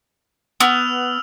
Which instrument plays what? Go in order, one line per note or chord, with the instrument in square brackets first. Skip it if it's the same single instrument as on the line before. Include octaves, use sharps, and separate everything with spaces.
[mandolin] B3 [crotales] E6 F6 F7